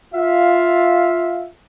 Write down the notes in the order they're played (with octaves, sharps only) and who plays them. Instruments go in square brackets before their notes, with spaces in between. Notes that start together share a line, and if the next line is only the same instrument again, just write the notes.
[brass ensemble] F4 E5 F5